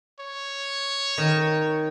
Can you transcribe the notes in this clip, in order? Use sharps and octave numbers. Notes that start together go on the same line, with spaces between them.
C#5
D#3